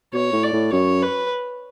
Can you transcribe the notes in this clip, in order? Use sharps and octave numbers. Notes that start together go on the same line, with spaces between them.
B2 C#5
A2
D5
A2
F#2 C#5
B4